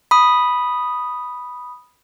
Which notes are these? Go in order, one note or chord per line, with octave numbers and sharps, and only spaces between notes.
B5 D#6